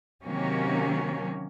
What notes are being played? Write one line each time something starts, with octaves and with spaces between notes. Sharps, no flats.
C3 D#3 F#3 A#3 C#4